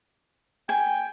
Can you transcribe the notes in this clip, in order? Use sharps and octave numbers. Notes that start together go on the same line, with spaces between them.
G5 G#5